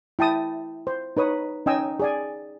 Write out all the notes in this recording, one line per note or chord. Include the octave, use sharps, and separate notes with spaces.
E4 G5 A5 D#6
C5
D#4 B4 C#5 D#6
C#4 D#4 D#5 G5 G#5 E6
G#4 D5 G#5